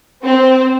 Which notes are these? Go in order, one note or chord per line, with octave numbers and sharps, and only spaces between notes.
C4